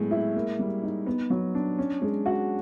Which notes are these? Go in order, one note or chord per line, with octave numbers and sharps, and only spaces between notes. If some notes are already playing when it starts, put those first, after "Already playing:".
Already playing: A2 F#3 G#3 B3
E4
A#3
G3
D#4
B3
F#3
D4
C#4
G#3
F#4